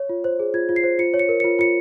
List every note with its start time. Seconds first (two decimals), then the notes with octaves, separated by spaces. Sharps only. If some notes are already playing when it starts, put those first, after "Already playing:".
Already playing: C#5
0.09 F4
0.24 C5
0.39 G#4
0.54 F4 G#6
0.69 F4
0.76 C7
0.83 C5
0.99 F4 C#7
1.14 C#5
1.19 C#7
1.29 A#4
1.40 F4 C#7
1.59 F4 C#7